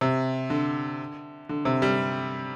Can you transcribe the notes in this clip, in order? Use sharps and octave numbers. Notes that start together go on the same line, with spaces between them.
C3
D3
D3
C3
G3